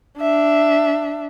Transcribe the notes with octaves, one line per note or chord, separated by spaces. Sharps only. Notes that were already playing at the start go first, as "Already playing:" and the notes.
D4 E5